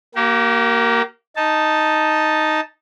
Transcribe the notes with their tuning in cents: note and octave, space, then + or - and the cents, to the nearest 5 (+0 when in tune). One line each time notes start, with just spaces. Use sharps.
A#3 +0 G4 -45
D#4 +0 A5 +0